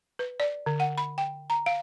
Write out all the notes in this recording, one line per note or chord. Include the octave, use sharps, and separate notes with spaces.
B4
D5
D3
F#5
B5
G5
A#5
F5